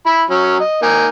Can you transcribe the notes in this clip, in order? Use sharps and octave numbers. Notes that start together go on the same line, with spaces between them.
E4 B5
F#3 C#4
D#5
A#3 D#4 G#5